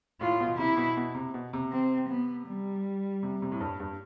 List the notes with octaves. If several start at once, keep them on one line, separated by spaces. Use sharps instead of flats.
A2 F4
B2
C3 E4
B2
B2
C3
B2
C3
C4
B3
G3
C3
C3
A2
G2
G2